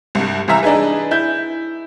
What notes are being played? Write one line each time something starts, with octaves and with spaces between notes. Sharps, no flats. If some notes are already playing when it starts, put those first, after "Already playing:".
C2 G2
C2 E3 E5 A#5 E6
D4 D#4 G#4 B4
E4 G6